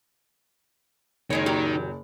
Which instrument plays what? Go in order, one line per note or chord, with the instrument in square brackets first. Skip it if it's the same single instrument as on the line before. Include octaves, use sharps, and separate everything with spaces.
[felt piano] F#1 [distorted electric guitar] D#3 [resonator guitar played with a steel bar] F#3 G#3 C#5
[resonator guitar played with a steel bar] A#2 F#3 G4